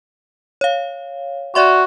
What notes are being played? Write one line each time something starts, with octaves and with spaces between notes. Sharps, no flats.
C#5 F5
F#4 D5 E5 C6